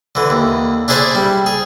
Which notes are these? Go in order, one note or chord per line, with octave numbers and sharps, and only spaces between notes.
D3 E3
D#2
D4 E4 G#4 C5 D5
G3
G#4